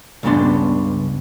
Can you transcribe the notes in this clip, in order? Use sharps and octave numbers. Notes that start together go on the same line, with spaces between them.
C#2 G2 C#3 B3 D4 C6